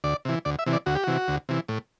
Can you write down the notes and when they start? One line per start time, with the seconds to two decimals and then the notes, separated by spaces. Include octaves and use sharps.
0.04 D2 D5
0.25 C3 E3
0.45 D2 D5
0.59 E5
0.66 C3 E3
0.73 D5
0.86 D2 F#4
0.95 G4
1.04 C3 E3 F#4
1.28 D2
1.49 C3 E3
1.68 A2